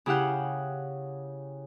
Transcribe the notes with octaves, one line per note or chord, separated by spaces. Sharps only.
C#3 E4 G4 F5 F#5 G6